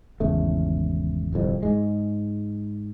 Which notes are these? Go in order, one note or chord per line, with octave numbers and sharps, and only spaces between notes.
G#1 E2 C#3 A3
D1 C2 F2
G#2 G#3